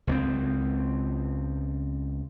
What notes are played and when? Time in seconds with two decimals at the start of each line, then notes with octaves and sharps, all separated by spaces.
0.07 C#2 A3 C4